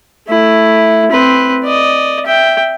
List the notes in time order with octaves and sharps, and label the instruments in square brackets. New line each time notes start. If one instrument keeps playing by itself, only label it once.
[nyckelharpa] A3 E4
C4 B4
D5 D#5
E5 G5